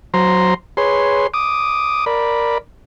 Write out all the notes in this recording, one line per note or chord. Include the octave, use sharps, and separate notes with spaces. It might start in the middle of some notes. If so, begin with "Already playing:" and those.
F#3 C5 A#5 C6
G#4 B4 C#5 C6
D6 D#6
A#4 D5 B5